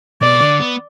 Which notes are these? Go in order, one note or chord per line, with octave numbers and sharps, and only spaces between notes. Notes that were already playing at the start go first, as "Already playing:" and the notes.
B2 D5
D3
B3